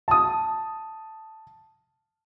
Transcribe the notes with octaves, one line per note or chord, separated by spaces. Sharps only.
A5 D#6